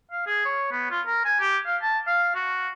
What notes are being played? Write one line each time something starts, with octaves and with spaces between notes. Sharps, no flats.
F5
G#4
C#5
B3
F4
A#4
G#5
G4
F5
A5
F5
F#4